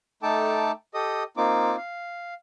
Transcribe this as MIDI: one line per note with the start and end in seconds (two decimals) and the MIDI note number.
0.23 0.71 57
0.23 0.71 63
0.23 0.71 69
0.23 0.71 79
0.23 0.71 81
0.23 0.71 86
0.94 1.23 67
0.94 1.23 69
0.94 1.23 75
0.94 1.23 87
1.37 1.76 58
1.37 1.76 60
1.37 1.76 63
1.37 1.76 65
1.37 1.76 86
1.77 2.34 77